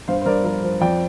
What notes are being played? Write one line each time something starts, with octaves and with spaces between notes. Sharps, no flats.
G2 C5 F5
C5
G2 A#4 D5
F3 A#4
F3
F2 D5 G5